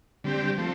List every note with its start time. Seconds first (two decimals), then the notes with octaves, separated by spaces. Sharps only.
0.24 D3 G3 C4 G4
0.58 F3 A3 C4